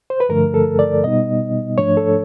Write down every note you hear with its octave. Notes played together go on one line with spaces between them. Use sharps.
C5
B4
G2 D3 F3 A3 A#4
A4
D5
B2 G3 B3 D#4 D#5
G#2 F3 A3 D4 C#5
A4